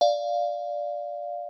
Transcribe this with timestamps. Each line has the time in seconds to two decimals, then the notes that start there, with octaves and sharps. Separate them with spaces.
0.01 D5 F5